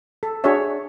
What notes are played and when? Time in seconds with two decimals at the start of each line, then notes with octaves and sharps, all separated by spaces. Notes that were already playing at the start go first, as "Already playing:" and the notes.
0.23 A4
0.44 D4 F#4 G#4 C#5 E5